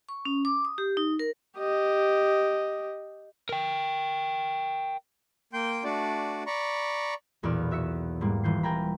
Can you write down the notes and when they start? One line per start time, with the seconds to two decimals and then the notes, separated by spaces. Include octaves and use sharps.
0.09 C#6
0.25 C#4
0.45 D6
0.65 D#6
0.78 G4
0.97 D#4
1.19 A#4
1.58 G4 D#5
3.49 A#4 G5
5.53 A#3 G5 C6 G6
5.84 A3 D4 F#4 D5
6.46 D5 A#5 B5 C#6
7.43 B1 E2 A#2 B3 D5 F6
7.71 F#4 E5 E6 B6 C#7
8.21 G#2 E3 G3 A#3
8.43 D#1 E3 G6 C7
8.63 C4 A#4 G5 G#5 A#5 B5